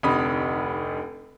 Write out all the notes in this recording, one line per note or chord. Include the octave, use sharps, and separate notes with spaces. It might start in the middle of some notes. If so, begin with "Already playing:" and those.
F1 D2 C3 D#4 B5 D#6